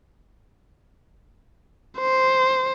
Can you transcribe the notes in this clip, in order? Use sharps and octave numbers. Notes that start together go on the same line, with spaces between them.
C5